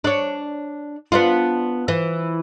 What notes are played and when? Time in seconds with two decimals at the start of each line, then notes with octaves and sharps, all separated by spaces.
0.04 D4 C#5
1.12 B3 D4 F4
1.88 E3